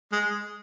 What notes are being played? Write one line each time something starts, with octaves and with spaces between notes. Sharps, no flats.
G#3